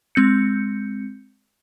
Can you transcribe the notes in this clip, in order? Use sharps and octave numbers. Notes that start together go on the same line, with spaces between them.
G#3 C4 G6 C#7